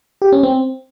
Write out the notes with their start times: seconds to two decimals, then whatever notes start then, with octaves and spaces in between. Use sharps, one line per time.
0.22 G4
0.32 C#4
0.43 C4